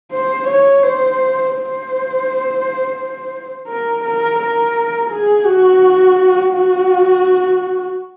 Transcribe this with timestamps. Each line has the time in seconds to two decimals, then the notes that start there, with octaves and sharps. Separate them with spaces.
0.11 C5
0.47 C#5
0.83 C5
1.54 C5
3.68 A#4
4.04 A#4
4.39 A#4
5.10 G#4
5.46 F#4
6.53 F#4